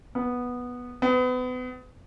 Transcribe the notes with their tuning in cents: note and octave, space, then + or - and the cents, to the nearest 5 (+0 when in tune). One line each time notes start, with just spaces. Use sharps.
B3 -5
B3 +35